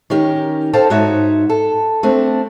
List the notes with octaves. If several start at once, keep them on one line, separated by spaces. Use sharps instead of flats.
D#3 C#4 G4 A#4
A4 C5 F5 G5 A5
G#2 D#4 F#4 C#5 E5
A4
A3 C4 D4